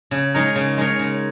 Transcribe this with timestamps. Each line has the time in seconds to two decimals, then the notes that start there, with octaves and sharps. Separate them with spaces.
0.11 C#3
0.34 G#3 D#4 A#4 C#5
0.56 C#3
0.78 G#3 D#4 A#4 C#5
0.99 C#3